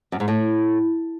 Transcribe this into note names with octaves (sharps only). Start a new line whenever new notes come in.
F#2
G#2
A2